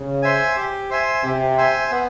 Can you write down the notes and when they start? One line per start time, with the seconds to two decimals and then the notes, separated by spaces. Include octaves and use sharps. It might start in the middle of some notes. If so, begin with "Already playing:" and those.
Already playing: C#3
0.22 C5 E5 G#5
0.56 G4
0.90 C5 E5 G#5
1.23 C3 G4
1.58 C5 E5 G#5
1.91 B3